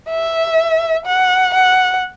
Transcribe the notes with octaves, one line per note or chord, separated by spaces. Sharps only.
E5
F#5
F#5